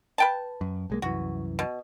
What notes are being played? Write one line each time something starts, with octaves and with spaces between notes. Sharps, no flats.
B4 G5 A5
F#2
B1 G#3 A#3
C2 F#2 E3 F#4
B2